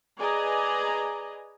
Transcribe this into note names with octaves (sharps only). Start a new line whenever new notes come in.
G#4 B4 D5 D#5 G#5 A#5